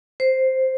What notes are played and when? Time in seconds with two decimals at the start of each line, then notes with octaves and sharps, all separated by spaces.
0.20 C5